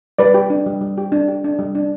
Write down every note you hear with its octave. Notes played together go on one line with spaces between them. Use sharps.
G3 B4 D5
G4
D4
G3
G3
G4
D4
G4
D4
G3
D4